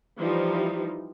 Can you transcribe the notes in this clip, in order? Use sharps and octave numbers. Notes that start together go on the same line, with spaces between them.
E3 F3 G3 D#4